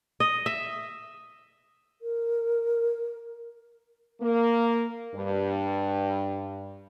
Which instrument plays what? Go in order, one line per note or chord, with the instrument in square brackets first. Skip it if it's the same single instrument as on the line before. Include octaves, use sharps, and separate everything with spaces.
[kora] D#5
E5
[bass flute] A#4
[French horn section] A#3
G2